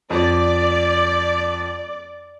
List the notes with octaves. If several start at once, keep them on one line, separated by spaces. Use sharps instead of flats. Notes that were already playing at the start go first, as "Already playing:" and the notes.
F2 D5